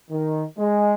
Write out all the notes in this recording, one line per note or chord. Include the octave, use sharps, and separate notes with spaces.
D#3
G#3